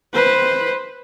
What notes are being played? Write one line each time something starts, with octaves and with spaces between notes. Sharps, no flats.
B4 C5